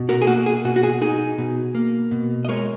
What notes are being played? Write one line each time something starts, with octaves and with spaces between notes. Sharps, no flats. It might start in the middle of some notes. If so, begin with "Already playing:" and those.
Already playing: B2
F#4 A#4
G#4
A#3 F#4
G#4
B2 F#4
F#4
G#4
D#4 G#4
B2
A#3
B2
D#5
G#3 A#4 C#5